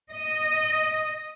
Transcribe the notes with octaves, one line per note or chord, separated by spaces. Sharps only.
D#5